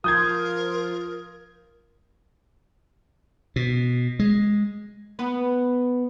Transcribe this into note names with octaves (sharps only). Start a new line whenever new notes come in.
F3 F4 A#4 D#6 G6 G#6
B2
G#3
B3 B4